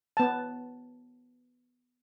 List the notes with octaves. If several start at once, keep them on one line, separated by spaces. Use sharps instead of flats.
B3 A5